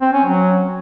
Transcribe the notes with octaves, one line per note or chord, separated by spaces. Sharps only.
C4
C#4
F#3